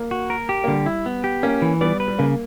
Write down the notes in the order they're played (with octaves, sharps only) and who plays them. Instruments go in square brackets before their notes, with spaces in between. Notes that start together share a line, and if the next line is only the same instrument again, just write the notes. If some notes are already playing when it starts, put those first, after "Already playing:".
Already playing: [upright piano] A#3
[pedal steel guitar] F#4
A#4
G4
[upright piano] A#3
[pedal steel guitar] D3 [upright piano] G3
[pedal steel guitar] E4
B3
G4
[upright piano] A#3 [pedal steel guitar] C#4
[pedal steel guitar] E3
[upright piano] G3 B3 [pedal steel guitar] D5
[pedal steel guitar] B4
[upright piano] G3
[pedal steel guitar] C#3 [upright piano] A#3